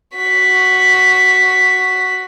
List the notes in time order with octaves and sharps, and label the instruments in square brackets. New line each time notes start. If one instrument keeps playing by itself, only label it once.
[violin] F#4 B6